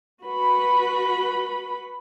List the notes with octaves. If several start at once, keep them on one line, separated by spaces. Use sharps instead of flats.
F#4 B4 B5